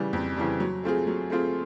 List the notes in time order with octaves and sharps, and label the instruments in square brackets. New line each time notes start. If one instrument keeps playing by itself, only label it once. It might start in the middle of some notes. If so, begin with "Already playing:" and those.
Already playing: [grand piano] C#3 E3 G3
F2
C#3 E3 G3
F#3
A3 C4 F4 G#4
F#3
A3 C4 F4 G#4